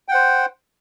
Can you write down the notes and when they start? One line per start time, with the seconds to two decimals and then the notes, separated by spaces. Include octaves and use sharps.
0.08 G5
0.11 F#5
0.14 C5